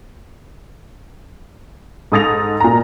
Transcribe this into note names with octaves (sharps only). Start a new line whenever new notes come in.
G#2 A4 D#6 A6 A#6 F7
A#2 A#5